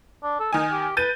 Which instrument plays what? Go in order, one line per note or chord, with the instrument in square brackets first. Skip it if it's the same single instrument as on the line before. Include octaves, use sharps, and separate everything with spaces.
[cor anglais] D4
A4
[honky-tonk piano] D#3 G#5 [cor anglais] D#4
[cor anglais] G4
[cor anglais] B4 [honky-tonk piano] G6 A6 D#7